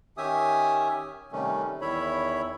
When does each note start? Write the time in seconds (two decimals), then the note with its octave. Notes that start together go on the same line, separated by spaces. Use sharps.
0.17 D#3 C#4 G4 E5 G#5 D#6
1.32 C3 D#3 G3 A3 C#4
1.81 E2 D#3 E4 C#5 E5 B5